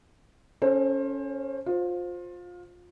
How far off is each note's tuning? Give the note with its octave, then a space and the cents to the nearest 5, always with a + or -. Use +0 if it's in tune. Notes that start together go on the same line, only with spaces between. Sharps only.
C#4 +0 A4 +0 C5 +30
F4 +25 C5 +0